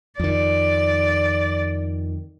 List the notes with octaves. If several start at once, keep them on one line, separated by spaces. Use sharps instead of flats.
F2 D#3 D5